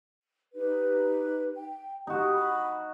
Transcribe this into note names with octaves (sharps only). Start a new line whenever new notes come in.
D#4 G4 B4
G5
D#4 F#4 G4
B5